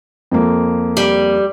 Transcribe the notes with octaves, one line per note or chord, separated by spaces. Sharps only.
F2 A#3
G3